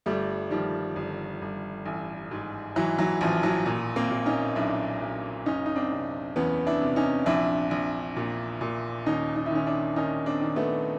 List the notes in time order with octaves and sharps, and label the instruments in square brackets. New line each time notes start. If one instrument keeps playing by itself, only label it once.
[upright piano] G1 G3 A3
D#3 F3 G3
G1
G1
A1
G#2
G#2 E3 F#3
E3 F#3
A1 F3
E3 F#3
A#2
A#3 C4
A#2
C#4 D#4
B1 D4 E4
B1
F#1 C#4 D#4
D#4
C4 D4
C3
E2 B3 C#4
D4 E4
C3
C#4 D#4
A#1 D4 E4
A#1
A#2
A#2
D#2 C#4 D#4
D#4
E4
D#3 C#4 D#4
D4 E4
D#3 C#4 D#4
C4 D4
D#3
A3 B3